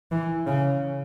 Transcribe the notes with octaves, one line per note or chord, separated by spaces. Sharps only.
E3
C#3